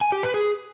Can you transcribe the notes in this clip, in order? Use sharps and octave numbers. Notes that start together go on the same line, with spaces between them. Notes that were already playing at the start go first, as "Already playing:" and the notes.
G#5
G4
B4
G#4